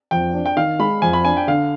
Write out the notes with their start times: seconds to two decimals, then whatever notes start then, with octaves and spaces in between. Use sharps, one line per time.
0.11 F2 G5
0.34 D4
0.46 G5
0.57 D#3 F5
0.79 G#3 B5
1.02 F2 G#5
1.13 B5
1.25 D4 G#5
1.37 G5
1.47 D3 F5